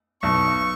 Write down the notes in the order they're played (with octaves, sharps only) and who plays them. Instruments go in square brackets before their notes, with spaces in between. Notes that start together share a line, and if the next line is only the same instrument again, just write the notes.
[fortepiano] B1 [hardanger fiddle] C#6